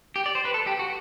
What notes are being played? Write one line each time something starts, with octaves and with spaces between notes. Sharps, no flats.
G4
D5
C5
B4
A4
G4
F#4